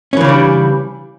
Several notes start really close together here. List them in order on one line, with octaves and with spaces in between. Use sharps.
C#4 E3 C#3 D4 G3